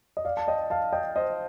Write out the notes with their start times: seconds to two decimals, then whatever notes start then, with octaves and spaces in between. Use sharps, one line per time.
0.17 D#5
0.25 D5 F5
0.37 A5
0.48 D#5 G5
0.70 F5 A5
0.93 D#5 G5
1.16 C5 D#5